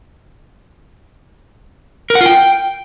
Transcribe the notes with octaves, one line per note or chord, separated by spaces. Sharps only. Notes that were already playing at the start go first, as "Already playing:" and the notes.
A#4
F#5
F4
G5